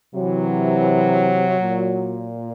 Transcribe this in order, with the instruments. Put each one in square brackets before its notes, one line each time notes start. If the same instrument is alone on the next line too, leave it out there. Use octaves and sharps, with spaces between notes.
[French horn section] C3 E3 F#3
A#2